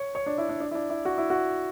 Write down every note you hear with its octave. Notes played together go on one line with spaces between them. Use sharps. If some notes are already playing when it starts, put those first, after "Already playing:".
Already playing: C#5
C#5
D4
E4
D4
D4
E4
D4
E4
F#4
E4
F#4